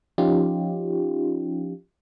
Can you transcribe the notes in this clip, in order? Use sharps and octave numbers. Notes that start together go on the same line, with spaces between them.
F3 C#4 D#4 F4 G4